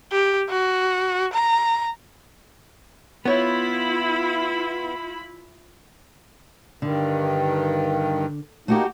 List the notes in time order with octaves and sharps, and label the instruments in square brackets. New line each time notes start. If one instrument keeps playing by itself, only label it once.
[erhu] G4
F#4
A#5
[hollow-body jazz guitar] B3 C#5 [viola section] E4 F4 B5
[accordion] G2 D#3 [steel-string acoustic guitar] D3
[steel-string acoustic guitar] A3 F#4 G4 [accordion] A#3 D#4